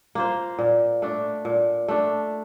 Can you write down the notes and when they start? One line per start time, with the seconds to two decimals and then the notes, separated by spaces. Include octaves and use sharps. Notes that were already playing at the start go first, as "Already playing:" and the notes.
0.15 A#3 F4 C5
0.59 A#2
1.02 A3 D4
1.45 A#2
1.88 A3 D4